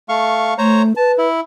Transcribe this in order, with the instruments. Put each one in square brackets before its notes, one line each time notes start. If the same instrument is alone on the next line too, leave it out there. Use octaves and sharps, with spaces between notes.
[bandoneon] A3 F5 C#6
[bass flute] A3 [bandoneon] C5 C#5 A#5
[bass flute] B4 [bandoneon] A5
[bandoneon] E4